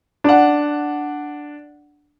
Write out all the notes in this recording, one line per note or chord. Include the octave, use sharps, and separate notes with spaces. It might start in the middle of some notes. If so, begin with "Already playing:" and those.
D4 F#5